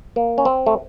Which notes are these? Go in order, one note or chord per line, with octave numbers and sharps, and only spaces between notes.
A#3
C#4
C4
A3